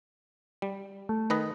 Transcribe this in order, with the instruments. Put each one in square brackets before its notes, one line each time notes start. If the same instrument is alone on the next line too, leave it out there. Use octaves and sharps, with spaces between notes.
[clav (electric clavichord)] G3
[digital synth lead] A3
[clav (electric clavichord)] D#3 B4 D#5